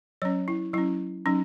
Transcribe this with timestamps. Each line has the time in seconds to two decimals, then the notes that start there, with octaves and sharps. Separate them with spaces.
0.22 F#3 C#4 C#5
0.48 E4
0.73 F#3 C#4 E4
1.26 F#3 C#4 D#4